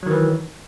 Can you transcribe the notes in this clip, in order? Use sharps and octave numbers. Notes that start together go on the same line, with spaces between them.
D#3 E3 F#3